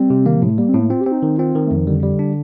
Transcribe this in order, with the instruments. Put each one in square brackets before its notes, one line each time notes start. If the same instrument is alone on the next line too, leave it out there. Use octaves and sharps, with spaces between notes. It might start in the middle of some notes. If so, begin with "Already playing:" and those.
Already playing: [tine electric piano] G3 [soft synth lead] C4
[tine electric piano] C3
[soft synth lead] D#3 [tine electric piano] A#3
[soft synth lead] F3
[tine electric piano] A2
[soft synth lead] A3
[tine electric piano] G3 [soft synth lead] A#3
[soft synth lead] C4
[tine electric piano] A2
[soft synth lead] A#3
[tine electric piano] C4 [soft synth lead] F4
[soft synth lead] G4
[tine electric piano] C4
[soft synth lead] D#4
[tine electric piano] D#3 [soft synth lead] D#4
[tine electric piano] C4 [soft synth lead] F4
[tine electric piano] D#3
[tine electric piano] F2 [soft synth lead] A3
[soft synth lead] F3
[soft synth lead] D3 [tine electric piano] G3
[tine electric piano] G3
D4